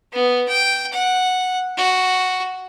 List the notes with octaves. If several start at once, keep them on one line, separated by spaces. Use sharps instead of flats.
B3
G5
F#5
F#4